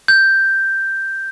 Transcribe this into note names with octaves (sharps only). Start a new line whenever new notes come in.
G6